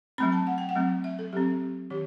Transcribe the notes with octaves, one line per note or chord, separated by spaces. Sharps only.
F#3 A3 C4 B5
A5
F#5
G5
F#5
F#3 A3 C4
E5
A4
F#3 C4 G4
D#3 G4